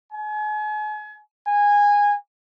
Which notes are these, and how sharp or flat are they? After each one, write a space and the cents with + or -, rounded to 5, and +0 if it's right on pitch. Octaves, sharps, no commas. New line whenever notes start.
G#5 +40
G#5 -15